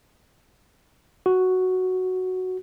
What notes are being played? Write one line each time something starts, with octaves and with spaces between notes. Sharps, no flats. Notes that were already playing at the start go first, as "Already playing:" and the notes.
F#4